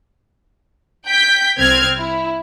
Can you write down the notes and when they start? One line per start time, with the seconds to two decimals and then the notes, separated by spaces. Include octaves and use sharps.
1.07 G5 G6 B6
1.58 C2 C4 F6 G#6
1.98 E4